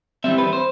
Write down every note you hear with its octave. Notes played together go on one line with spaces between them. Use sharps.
E3 G3 C4 E5
B4
C5